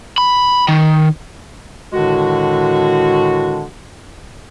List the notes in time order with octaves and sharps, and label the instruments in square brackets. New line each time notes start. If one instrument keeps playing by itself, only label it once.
[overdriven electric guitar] B5
D#3
[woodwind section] A2 D3 D#3 G#3 D4 F#4